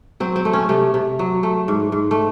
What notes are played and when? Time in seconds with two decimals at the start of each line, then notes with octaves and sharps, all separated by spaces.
0.20 F#3 C4
0.36 C4
0.45 A3
0.53 C#4
0.69 C3 A3
0.94 C3
1.19 F#3
1.43 A3
1.68 G#2
1.92 G#2
2.11 A3